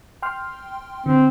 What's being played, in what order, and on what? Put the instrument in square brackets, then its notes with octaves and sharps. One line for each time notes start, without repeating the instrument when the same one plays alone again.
[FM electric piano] G5 C6 F6
[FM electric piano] D3 [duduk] C4